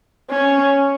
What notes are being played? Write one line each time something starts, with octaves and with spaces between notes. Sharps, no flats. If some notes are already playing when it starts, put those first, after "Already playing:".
C#4